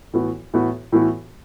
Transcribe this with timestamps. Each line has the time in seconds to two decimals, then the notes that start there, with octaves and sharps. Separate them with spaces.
0.14 A2 E3 B3 F#4
0.54 A2 E3 B3 F#4
0.92 A2 E3 B3 F#4